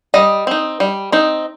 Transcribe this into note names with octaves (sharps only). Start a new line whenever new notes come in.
G3 D#5
C4 D#4
G3
C4 D#4